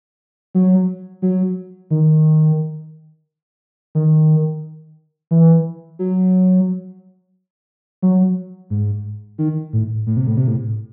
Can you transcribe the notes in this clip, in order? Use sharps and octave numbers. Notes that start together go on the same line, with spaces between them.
F#3
F#3
D#3
D#3
E3
F#3
F#3
G#2
D#3
A2
A2
C3
A2
C3
A2